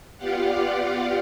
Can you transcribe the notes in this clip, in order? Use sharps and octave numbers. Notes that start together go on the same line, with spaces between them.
B3 F4 G4 D5 F5 F#5